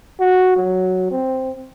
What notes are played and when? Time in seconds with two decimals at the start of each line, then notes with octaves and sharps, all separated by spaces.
0.20 F#4
0.56 F#3
1.11 C4